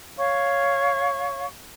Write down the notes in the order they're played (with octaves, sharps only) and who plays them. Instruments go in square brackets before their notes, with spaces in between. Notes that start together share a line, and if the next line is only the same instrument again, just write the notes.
[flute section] C#5 F5 C#6